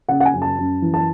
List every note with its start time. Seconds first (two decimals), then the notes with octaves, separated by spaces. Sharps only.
0.09 C#3 F#5
0.20 F#5
0.25 G#5
0.33 F#2
0.42 A5
0.58 F#2
0.82 E3
0.94 A5